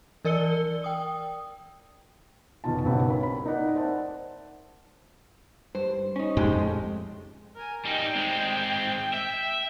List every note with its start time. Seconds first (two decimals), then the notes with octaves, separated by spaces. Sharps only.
0.25 E3 A#4 D5 E6 C#7 G7
0.84 G5 D#6
2.64 F1 B2 D#3 F4 A5
2.85 B1 G2 C#3 C4 F#5 B5
3.08 A#4 B4 C#5 B5
3.23 B5
3.46 D#4 A#4 D5 F#5 A#5
3.76 C5 D5 E5 F#5 A5
5.75 G2 C5
6.16 C#4 D#4
6.37 F2 G#3 A3 G4
7.55 A#4 G#5
7.85 G3 D#4 G5
8.15 G#3 C4
9.13 E5